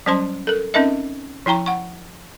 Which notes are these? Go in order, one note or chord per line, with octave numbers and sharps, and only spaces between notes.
F#3 G3 C#4 C5 A5 C6
A4 A#4
C4 C#4 D#4 A#4 D#5 E5
F3 E4 G5 A#5 C#6
F#5 C#6